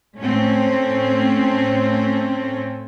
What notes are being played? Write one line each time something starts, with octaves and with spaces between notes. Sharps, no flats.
A2 A3 C4 C#4